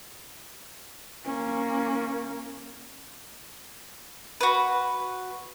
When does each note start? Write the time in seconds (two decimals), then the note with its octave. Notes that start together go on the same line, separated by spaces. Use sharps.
1.25 A#3 C#4
4.41 F#4 B4